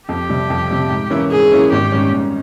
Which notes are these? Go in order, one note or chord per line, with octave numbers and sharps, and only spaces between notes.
F2 G4
C3 G3
F2
C3 G3
G#2
E3 A#3 C#4 E4
G#2 G#4
E3 A#3 C#4 E4
G#1 G4
G#2 G3 C#4
G#1